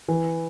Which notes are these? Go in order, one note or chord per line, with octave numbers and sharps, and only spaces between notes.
E3